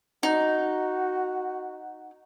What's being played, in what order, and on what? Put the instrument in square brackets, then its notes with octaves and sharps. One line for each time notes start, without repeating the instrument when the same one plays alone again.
[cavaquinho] D#4 [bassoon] F#4